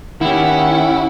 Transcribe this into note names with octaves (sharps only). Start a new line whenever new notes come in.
D#3 C#4 E4 G4 F#5